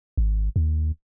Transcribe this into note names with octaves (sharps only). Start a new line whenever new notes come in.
G#1
D#2